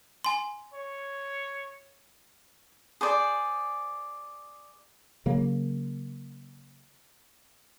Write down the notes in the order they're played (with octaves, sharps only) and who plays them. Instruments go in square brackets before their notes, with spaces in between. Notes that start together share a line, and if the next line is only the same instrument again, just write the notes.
[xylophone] G#5 C6
[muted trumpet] C#5
[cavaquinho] G#4 C5 D5
[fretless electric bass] C#3 F#3 A#3